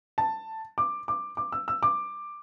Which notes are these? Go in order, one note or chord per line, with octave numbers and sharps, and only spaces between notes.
A5
D6
D6
D6
E6
E6
D6